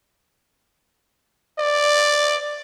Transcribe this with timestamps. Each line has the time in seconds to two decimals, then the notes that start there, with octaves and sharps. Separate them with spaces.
1.59 D5